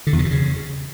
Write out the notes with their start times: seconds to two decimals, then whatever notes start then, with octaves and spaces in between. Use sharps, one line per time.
0.07 D3
0.13 E2
0.19 C3
0.25 B2
0.31 C#3